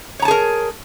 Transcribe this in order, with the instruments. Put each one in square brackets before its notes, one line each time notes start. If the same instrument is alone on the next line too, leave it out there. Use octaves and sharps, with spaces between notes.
[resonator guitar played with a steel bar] C#5
A#5
A5
G#4
A#4